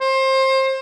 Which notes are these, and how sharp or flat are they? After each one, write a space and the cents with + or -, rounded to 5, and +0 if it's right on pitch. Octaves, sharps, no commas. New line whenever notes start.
C5 +25